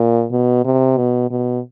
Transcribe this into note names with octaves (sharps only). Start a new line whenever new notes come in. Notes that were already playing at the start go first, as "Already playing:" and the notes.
Already playing: A#2
B2
C3
B2
B2